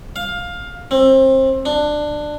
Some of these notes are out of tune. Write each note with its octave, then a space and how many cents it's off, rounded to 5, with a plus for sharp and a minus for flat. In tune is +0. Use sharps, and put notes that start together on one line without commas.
F5 +15
C4 +25
D4 +15